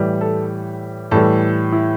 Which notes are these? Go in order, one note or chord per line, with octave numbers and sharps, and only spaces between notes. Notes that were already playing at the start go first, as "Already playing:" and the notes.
Already playing: A2 E3 G3
A4
A2 E3 G3 A4
E4